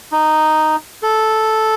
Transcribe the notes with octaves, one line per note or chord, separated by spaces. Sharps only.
D#4
A4